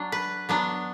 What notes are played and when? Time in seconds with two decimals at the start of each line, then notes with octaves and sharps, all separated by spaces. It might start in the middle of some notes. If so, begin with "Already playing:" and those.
Already playing: F#3 D4
0.12 B4
0.49 F#3 B3 D4